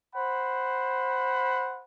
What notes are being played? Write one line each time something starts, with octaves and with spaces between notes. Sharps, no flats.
C5 F#5 B5